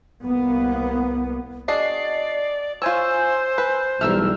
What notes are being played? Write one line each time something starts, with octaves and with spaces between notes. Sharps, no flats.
C2 A#3 B3
D4 F#4 G#4 D5 D#5 C7
F4 C5 C#5 G#5 E6
B4
B1 E3 G3 A3 A#4 E6 F6